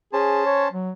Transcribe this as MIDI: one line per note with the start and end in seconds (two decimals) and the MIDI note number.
0.13 0.68 61
0.13 0.45 68
0.13 0.68 72
0.13 0.68 81
0.46 0.66 73
0.72 0.91 54